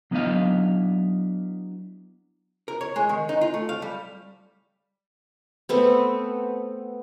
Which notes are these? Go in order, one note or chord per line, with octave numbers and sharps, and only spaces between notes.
F#3 B3 D4 E4 D#5 F5
A#4
C#5
G#3
D#3
D#4
F4
A3
F5
G3
A3 B3 C4